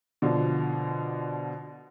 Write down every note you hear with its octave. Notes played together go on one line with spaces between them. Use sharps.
B2 D3 F3